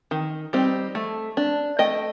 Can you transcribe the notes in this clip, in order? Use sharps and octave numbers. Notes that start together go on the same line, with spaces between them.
D#3
G3 C4 D#4
A3
D4
A3 D#5 G5